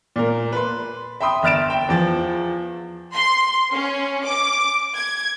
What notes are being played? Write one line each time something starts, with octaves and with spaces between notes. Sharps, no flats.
A#2 A#4
B4 C6
E5 G5 B5 C6 D#6
G1 E5 F6 A6 D7 E7
G5
E2 F3 A6
C6
C#4
D6
G#6